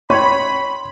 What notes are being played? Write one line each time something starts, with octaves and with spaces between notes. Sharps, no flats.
C#4 C#5 B5 C6